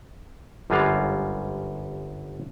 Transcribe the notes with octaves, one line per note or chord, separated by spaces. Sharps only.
G1 F#2 G3 G#3 F4 F5